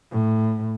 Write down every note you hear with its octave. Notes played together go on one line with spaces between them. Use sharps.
A2